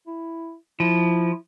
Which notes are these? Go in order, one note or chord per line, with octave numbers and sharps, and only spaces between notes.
E4
F3 E4